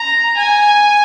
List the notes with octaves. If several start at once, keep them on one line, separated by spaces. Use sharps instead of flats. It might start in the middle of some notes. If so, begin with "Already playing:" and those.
Already playing: A#5
G#5